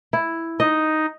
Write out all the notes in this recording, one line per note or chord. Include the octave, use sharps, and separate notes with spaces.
E4
D#4 D#5